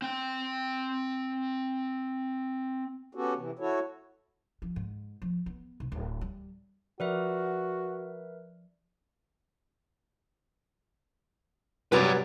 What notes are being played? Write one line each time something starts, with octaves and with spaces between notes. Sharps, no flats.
C4 G5
B3 C#4 F#4 G4 A4
C3 E3
E4 F#4 A4 C#5
F3
G#2
F3
B3
B1
D1
G3
F3 F#4 A#4 B4 D5 E5
C3 F#3 G3 B3 B4 D5 G#5 A#5